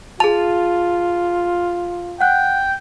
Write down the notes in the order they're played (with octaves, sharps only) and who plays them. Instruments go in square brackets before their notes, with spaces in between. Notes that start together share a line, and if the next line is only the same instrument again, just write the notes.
[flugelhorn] F4 [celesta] G#4 F7 [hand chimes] A5
[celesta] F#5 F#6 [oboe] G5